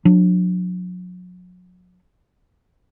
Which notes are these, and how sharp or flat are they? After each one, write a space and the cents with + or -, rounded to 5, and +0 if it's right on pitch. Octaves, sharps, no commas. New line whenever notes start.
F#3 -40 D4 +15